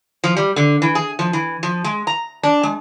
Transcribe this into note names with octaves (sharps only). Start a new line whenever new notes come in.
F3
G3
D3
E3
G#4
F3
E3
F3
G#3
A#5
D4
G#3